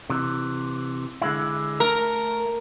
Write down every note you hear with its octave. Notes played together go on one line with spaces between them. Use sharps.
C3 E3
D3 G#3 E4
A3 A#4